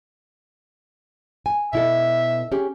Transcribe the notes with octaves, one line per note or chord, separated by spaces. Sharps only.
G#5
B2 E4 A4 E5
C#4 G4 G#4